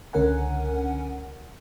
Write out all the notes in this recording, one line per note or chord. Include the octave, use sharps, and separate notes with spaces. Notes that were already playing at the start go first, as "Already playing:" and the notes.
C#2 D3 C#4 A#4 F#5 G#5